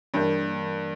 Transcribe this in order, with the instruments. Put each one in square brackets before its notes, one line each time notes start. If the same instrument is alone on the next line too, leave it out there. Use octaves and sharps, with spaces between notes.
[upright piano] G2 [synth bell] E3 A#3 D4 A#4